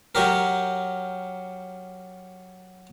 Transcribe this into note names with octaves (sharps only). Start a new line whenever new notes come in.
F#3 C#4 G4 A#4